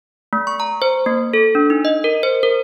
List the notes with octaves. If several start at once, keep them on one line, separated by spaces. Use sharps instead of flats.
A3
C#6
A#5
C5
A#3
A4
D4
D#4
D#5
A#4
C5
A#4